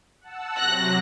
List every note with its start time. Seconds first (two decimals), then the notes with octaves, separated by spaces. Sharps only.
0.21 F#5 A5 E6
0.58 C3 F#3 F#6 A#6